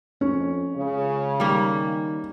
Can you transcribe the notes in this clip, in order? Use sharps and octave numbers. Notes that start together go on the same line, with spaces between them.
F2 C#4
C#2 C#3
D#3 G3 A#3